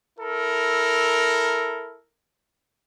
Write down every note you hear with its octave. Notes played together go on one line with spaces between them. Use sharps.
E4 A4 A#4